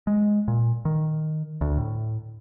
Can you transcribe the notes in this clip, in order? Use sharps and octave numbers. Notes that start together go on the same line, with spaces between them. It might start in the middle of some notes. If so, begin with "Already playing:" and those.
G#3
A#2
D#3
D2
A2